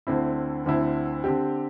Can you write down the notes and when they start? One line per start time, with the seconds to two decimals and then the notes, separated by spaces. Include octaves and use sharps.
0.07 D2 D3 C4 E4
0.66 D2 D3 C4 E4
1.24 D3 C4 G4